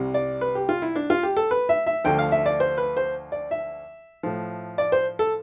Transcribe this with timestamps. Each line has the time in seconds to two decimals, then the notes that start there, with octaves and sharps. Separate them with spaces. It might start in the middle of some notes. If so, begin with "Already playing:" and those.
Already playing: C2 C3 G3
0.14 D5
0.41 B4
0.55 G4
0.69 F4
0.82 E4
0.95 D4
1.10 F4
1.23 G4
1.37 A4
1.51 B4
1.69 E5
1.86 E5
2.04 D2 D3 F3 G5
2.19 F5
2.32 E5
2.46 D5
2.60 C5
2.78 B4
2.97 C5
3.32 D5
3.51 E5
4.23 A2 F3
4.78 D5
4.92 C5
5.19 A4